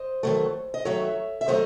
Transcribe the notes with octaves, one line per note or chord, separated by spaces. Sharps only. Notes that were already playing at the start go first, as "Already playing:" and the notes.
Already playing: C5 D#5
D#3 F#3 A3
D#5
D#3 F#3 A3 C#5 E5
E5
D#3 F#3 A3 C5 D#5